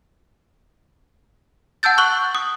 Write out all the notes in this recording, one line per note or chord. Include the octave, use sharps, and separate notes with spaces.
F#5 A5 E6 G6 A6
C#6 F#6 F#7 G7
D#6